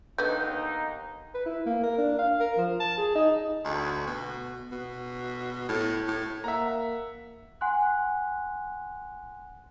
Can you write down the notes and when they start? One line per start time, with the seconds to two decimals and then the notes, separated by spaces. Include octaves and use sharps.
0.18 D#2 D3 B3 D#4 G6
1.34 B4
1.46 E4
1.66 A#3
1.83 A#4
1.98 D4
2.19 F5
2.40 A#4
2.58 F3
2.80 A5
2.98 G#4
3.15 D#4
3.64 D2
4.07 B2
4.72 B2
5.69 A2
6.07 A2
6.44 A#3 E5 F#5 A#5
7.61 F#5 G#5 C6 F#6